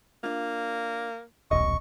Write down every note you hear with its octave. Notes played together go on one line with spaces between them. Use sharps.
A#3 D4 F4
D#1 B1 D#5 C#6